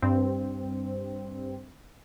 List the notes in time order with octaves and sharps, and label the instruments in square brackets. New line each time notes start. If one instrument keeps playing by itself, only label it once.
[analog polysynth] G2 C4